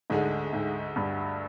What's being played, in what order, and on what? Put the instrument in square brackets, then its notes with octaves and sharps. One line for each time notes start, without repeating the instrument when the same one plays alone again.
[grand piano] D2 D3 G#3 [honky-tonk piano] G#2
[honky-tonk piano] G#2
G2